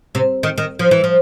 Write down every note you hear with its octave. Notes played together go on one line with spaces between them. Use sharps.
C3
D#3
D#3
F3
E3
F3